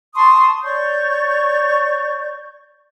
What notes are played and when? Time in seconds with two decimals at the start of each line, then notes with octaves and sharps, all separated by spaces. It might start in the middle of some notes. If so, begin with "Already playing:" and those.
0.15 A5 C6 C#6 D#6
0.63 C#5 D5 C#6 G6